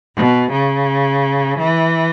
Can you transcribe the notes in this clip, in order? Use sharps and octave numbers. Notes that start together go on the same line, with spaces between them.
B2
C#3
E3